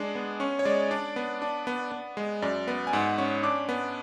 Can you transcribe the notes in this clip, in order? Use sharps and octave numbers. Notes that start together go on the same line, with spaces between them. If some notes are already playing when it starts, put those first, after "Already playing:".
Already playing: G#3 D4
B3
C#4 C#6
C#5
G#3 D5
D4 D5
B3
D4
B3
B3
G#3
F#2 D5
B3
G#5
G#2 F#5
C#4 C#6
D4 D6
B3